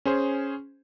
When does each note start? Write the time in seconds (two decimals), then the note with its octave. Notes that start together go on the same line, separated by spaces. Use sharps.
0.05 C#4 G#4 C5